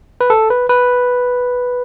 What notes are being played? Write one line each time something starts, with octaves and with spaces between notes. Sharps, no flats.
B4
A4
B4
B4